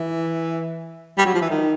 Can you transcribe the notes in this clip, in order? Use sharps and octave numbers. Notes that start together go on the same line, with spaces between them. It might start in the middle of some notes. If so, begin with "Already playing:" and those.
Already playing: E3
G3
F#3
F3
E3
D#3